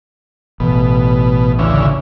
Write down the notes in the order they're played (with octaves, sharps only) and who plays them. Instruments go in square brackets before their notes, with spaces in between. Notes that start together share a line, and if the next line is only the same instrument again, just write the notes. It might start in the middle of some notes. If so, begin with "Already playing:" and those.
[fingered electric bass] A1 [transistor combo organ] B2
[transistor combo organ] D2 C#3 E3